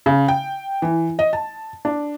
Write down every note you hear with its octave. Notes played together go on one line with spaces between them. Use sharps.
C#3
G5
E3
D#5
A5
D4